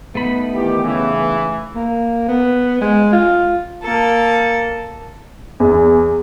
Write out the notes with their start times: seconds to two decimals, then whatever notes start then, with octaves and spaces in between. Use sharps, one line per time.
0.15 A3 B3 D#4 B5
0.53 D#3 E3 G4
0.83 C#3 E3
1.75 A#3
2.28 B3
2.81 G#3
3.13 F4
3.83 A#3 A4
5.60 E2